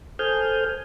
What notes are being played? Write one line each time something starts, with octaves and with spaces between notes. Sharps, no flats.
A4 C5 G#5 D#6 F6 G6